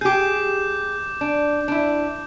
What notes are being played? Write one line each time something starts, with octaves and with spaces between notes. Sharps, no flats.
G4 G#4 D6 G6
D4
D4 E4